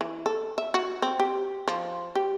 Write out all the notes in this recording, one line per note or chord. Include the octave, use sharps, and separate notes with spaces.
E3
A4
E5
F#4
C4
G4
F3
G4